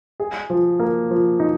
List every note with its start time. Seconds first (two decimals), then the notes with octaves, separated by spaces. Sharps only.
0.20 G#4
0.50 F3
0.80 A#3
1.11 F3
1.40 D#4